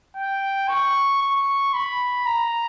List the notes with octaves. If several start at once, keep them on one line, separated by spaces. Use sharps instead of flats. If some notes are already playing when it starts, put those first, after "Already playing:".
G5
C#6
C#6
B5
A#5